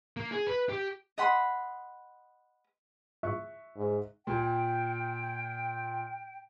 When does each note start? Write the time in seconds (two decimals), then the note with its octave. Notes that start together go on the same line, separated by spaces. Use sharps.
0.17 A#3
0.32 G#4
0.47 B4
0.69 G4
1.18 D#5 F#5 B5 C6
3.23 E5 C#6 F#6
3.76 G#2
4.27 A#2 G5